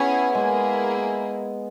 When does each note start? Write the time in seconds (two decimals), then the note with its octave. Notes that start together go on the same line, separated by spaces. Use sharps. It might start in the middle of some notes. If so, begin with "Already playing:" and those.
Already playing: B3 C#4 E4 G#4 C#5 G#5
0.35 G#3 A#3 E4 G#4